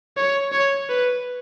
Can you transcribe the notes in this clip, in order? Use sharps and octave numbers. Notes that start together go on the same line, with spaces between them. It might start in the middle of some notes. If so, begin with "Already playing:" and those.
C#5
C#5
B4